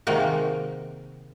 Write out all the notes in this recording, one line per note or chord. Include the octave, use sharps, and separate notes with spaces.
C3 D#3 G#3 A#3 F#4